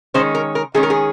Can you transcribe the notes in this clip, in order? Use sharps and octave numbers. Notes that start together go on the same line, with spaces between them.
D#3 G#3 C#4 C5
A#4
A#4
D#3 G#3 C#4 G#4
A#4
G#4